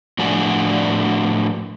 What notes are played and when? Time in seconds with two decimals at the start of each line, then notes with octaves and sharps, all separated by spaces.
0.19 A2 F3 D4 F#4 D5 G#5